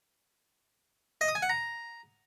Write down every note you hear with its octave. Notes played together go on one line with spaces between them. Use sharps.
D#5
D#6
G#5
F#5
A#5